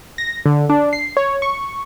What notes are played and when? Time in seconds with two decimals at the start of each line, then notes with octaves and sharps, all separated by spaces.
0.18 A#6
0.46 D3
0.69 D4
0.93 C7
1.17 C#5
1.42 C#6